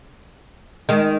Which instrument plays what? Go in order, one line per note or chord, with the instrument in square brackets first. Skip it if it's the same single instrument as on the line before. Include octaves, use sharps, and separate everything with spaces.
[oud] D#3 G#3